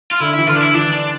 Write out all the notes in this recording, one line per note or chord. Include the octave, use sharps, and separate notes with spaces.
F4
D3 E4
E3 E4
D3 F4
D4
E4
E3 D4
D4